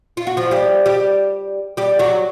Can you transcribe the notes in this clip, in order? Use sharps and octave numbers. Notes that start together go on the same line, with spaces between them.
F4
F#4
F3 F4
G3 G4
G3 G4
G3 G4
F#3 F#4